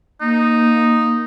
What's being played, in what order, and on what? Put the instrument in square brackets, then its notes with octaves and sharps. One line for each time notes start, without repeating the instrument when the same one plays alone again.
[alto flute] A#3 [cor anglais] D#4